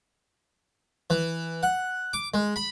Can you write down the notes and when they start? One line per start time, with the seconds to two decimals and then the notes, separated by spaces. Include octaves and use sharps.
1.10 E3
1.63 F#5
2.13 D6
2.34 G#3
2.56 B5